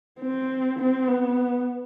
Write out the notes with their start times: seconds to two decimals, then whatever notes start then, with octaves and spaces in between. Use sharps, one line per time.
0.19 C4
0.79 C4
1.08 B3